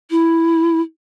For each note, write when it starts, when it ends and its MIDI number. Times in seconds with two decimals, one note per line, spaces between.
0.11 0.81 64